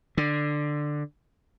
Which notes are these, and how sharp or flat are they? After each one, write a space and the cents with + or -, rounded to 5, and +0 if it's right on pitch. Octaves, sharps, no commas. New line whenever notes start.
D3 +10